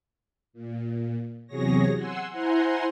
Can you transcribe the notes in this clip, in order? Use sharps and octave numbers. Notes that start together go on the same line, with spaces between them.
A#2
E2 C3 F#3 G#4 C#5 A#6
F#5 G#5 C6 E6
E4 C5 F#5 G#5 A#5 C6